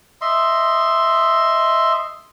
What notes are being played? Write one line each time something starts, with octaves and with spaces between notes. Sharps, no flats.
D#5 E5 C6